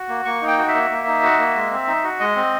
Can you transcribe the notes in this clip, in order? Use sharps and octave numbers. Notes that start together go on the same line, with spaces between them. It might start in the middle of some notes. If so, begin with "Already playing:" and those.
Already playing: F#4
A#3
A#3 C#6
D#4
G5
F#4
E5
A#3
A#3
D#4
F#4
A#3
G#3
C4
D#4
F#4
G#3 D#5
C4